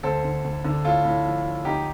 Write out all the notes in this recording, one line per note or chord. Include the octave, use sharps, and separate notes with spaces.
D2 A4 C5
D3
D2
D3
A2 F4 A4
A2
F3
F3
D2 D#4 G4